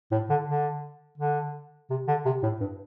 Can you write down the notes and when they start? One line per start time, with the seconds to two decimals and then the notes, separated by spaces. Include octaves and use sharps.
0.12 A2
0.30 D3
0.47 D3
1.18 D3
1.90 C3
2.08 D3
2.25 C3
2.43 A2
2.60 G2